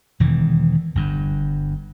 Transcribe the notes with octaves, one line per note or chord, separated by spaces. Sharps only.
E1 D#3 E3
G1 G2